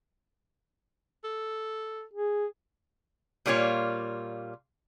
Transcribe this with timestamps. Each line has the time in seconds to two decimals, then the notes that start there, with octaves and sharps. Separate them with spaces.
1.24 A4
2.14 G#4
3.46 A#2 G3 A#3 F4 C#5